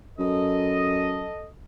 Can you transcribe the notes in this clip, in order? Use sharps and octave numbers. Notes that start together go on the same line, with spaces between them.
F#2 A4 D#5